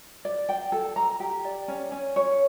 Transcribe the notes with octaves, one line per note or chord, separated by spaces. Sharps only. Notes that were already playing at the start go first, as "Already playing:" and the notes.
D5
G5
A4
A#5
G4
D5
C#4
C#4
C#5